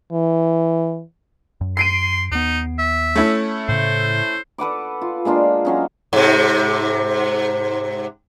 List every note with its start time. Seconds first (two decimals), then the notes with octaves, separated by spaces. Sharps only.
0.12 E3
1.61 F#2
1.77 C6 C7 D7 D#7
2.31 D#2 B3 D#4
2.78 E5
3.16 A3 C#4 E4
3.69 A2 C#3 C5
4.58 A4 B4 F#5 D6
5.02 F4
5.25 G#3 A#3 D4 F4
5.65 F#3 C#4 D#4
6.13 G#2 C3